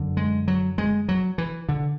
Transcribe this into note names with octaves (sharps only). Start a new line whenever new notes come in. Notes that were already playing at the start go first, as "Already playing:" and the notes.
Already playing: F#2 D3
G#3
F#3
G#3
F#3
E3
D3